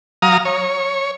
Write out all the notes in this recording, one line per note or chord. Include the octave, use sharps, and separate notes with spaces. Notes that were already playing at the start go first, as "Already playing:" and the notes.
F#3 F5 A#5 D#6
C#5